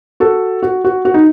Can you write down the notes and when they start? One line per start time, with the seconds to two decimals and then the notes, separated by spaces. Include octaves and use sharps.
0.20 F#4 A4
0.63 F#4
0.85 F#4
1.05 F#4
1.14 D#4